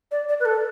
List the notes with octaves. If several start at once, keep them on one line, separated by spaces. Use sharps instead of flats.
D5
D5
B4
A4